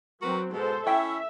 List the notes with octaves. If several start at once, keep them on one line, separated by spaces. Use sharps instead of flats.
F#3 C4 F#4 A#4 B4
G#2 B2 G#3 A4 C5
C#4 E4 E5 G5